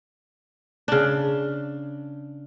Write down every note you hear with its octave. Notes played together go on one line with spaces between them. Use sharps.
C#3 D4